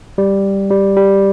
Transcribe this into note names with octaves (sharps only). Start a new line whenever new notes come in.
G3
G3
G3